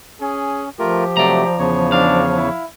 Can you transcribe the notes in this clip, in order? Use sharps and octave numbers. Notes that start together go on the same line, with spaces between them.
C#4 G#4
F3 A3 F4 G4 A#4
C3 F#3 A3 D5 A#5
E2 C#3 C#5
D4 F5
E4